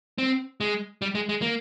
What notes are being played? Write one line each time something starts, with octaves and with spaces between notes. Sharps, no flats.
C4
G#3
G3
G#3
G#3
A#3